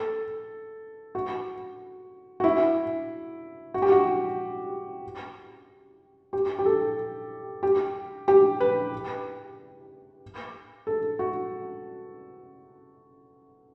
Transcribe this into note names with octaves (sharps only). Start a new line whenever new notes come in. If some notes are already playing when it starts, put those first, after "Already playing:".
Already playing: A4
F#4
F#4
E4
F#4
G4
F#4
G4
G4
A4
G4
G4
B4
A4
F#4